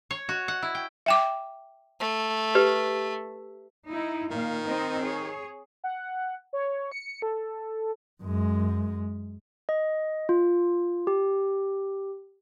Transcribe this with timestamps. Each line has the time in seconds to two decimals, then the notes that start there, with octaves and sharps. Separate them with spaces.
0.11 C#5
0.29 F#4
0.48 F#5
0.62 E4
0.75 G5
1.06 E5 G5 D6
2.00 A3
2.55 G4 B4
3.88 D#4 E4
4.31 A#2 D#3 F5
4.65 C4 D#4 D#5
5.01 G#4 C#5
5.84 F#5
6.53 C#5
6.92 C#7
7.22 A4
8.22 F#2 G#3
9.69 D#5
10.29 F4
11.07 G4